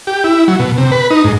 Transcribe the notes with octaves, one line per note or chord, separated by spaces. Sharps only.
G4
E4
F#3
B2
C3
B4
D#4
G#2